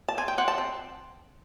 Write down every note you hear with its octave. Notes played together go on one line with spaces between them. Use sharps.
A5
C4 G#5
G5
C4 F#5
A5
C4